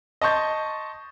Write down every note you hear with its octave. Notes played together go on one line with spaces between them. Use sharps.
D#5 A5 C6 C#6 G6 A6